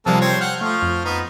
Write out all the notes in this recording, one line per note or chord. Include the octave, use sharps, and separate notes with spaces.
C3 F3 G3 G#3 A#3 A4
C4 C5 C#5
F#5 F6 G6
F3 A3 F5 C#6
F2
B3 D#4